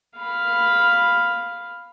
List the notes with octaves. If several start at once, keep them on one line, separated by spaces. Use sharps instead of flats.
F5 B5